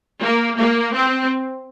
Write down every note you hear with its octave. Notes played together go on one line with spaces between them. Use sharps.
A#3
A#3
C4